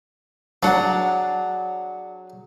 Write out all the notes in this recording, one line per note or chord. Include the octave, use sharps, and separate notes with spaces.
F#3 D4 G#4 F#5 A#5